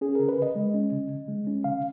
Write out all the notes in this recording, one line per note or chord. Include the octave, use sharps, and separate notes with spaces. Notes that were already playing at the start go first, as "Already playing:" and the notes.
C#4 G#4
C#3 A#4
B4
C#3
D#5
G#3
C#4
C#3
C#3
G#3
C#4
C#3 F5